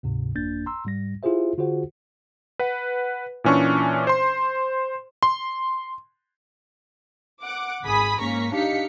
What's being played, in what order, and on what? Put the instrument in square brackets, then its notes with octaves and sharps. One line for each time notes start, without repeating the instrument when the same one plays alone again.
[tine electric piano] D2 G#2 C3
G1 F2 A#3 D4 G6 A6
A#5 C6 E6
G#2 G3 A#6
E4 F4 G4 G#4 C5 E5
D3 F4 F#4 G#4 C5 F#5
[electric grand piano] B4 F#5
A#2 E3 C#4 D4 C#6
C5 C6
C6
[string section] F#5 D6
G#1 G#4 G#5 B5 D#6 B6
G#2 A#3 C#4 A#5 C#6 B6
D4 D#4 G4 F5 B6 C#7